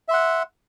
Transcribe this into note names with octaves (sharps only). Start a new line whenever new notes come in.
E5 F#5 C6